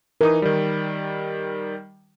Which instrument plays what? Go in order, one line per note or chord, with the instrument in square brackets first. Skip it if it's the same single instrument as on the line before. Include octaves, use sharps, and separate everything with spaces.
[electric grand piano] E3 D#4 [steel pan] A#4 D#6
[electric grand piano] D#3 G3